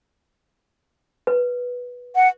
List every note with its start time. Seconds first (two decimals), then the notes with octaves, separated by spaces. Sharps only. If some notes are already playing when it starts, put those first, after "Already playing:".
1.27 B4
2.16 F#5